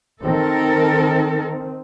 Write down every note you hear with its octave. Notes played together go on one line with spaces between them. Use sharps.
D#3 C4 A4 A#4